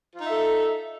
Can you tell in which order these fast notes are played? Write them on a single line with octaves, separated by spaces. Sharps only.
F4 D#4 E5 A4